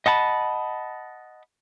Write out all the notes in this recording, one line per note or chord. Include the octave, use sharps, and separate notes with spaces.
D#5 F#5 A5 B5